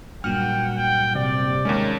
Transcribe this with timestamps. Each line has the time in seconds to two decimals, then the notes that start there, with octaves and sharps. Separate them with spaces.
0.24 G2 A#2 F#3 F#5 G5 F6
0.77 G5
1.15 C3 D5
1.65 D#2 G#3 A#3 C#4